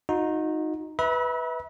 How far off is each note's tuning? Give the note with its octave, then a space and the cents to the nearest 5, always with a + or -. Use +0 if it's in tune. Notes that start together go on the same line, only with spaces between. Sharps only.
D#4 +0 F#4 -40
B4 +0 E5 -30 B5 -40